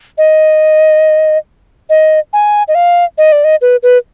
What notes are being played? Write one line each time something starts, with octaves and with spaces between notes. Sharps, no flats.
D#5
D#5
G#5
D#5
F5
D#5
D5
D#5
B4
B4